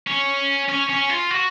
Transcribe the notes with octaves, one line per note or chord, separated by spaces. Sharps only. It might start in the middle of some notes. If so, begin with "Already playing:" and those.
C#4
C#4
C#4
F4
F#4